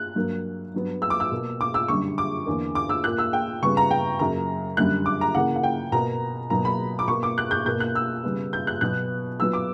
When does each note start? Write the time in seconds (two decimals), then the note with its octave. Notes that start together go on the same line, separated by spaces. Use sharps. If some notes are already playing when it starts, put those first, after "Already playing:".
Already playing: F#6
0.15 G2 F#3 A#3
0.74 G2 F#3 B3
1.02 E6
1.10 D6
1.20 E6
1.32 B2 A#3
1.61 D6
1.74 E6
1.88 F#2 D3 G3 C#6
2.18 D6
2.46 E2 D3 A#3
2.75 D6
2.89 E6
3.04 A#2 A#3 F#6
3.18 E6
3.33 G5
3.62 C#3 G3 B3 C#6
3.77 A#5
3.91 G5
4.19 F#2 C#3 F#3 A#3 A#5
4.77 F#2 D3 G3 F#6
5.06 D6
5.21 A#5
5.35 C#3 E3 A#3 F#5
5.56 F#5
5.63 G5
5.92 B2 A#3 A#5
6.50 B2 F#3 A#3 A#5
6.65 B5
6.99 D6
7.08 B2 A#3 C#6
7.23 D6
7.38 F#6
7.51 G6
7.66 B2 A#3 G6
7.80 F#6
7.95 E6
8.24 C#3 G3 B3
8.53 G6
8.67 F#6
8.81 B2 F#3 B3 F#6
9.39 A#2 F#3 B3 E6
9.53 D6